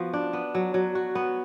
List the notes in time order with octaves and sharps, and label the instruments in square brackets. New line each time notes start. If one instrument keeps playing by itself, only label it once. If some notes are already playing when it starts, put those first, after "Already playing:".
Already playing: [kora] F3 B3 F#4
D4
B3
F#3
F#3
F#4
B3